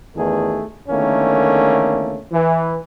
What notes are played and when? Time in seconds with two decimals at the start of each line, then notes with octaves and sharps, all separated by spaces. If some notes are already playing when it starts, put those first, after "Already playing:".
0.15 A1 E2 D#3 A3 G#4 A4
0.88 E2 D3 D#3 A3 A#3 C#4
2.31 E3